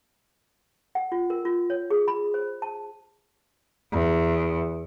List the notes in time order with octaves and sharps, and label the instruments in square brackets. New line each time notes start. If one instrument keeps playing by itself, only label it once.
[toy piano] F#5
F4
A#4
F4
C#5
G#4
B5
C5
A5
[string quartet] E2